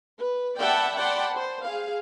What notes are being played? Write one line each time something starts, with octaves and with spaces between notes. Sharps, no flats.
B4
D5 E5 F#5 G5 A5 B5
D5 F#5 G5 A5 B5 C6
C5
G#4 F5